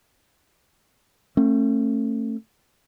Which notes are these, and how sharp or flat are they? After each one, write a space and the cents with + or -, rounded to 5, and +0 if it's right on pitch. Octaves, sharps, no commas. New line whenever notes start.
A3 +25 C#4 -35